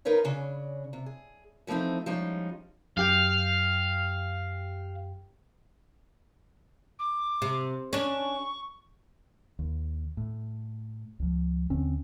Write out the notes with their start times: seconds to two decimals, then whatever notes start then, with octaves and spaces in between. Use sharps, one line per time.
0.05 D#4 A#4 B4 C#5 F5
0.24 C#3 C#4 D4
0.93 C3
1.06 G#4
1.67 E3 F3 A3 C4 D#4
2.06 F3 G3 G#3 C#4 D#4
2.97 F#2 G4 F5 G5
6.99 D6
7.42 C3
7.93 C#4 D4 C#6
9.59 D#2
10.17 A2
11.19 C#2 F3
11.70 D#2 D3 C4 C#4